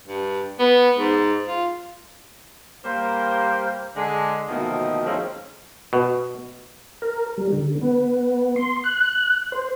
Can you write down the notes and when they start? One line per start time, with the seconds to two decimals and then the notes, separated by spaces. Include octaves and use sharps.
0.06 G2
0.59 B3
0.96 G#2
1.46 F4
2.85 G3 A#3 C5
3.95 D3 G#3 D4
4.48 D2 B2 D#3 F3 A#3 D#5
5.06 D#3 F3 G#3 A3 C4 C#4
5.93 B2
7.02 A#4
7.38 G3
7.52 D3
7.81 B3
8.56 C6
8.84 F#6
9.52 C5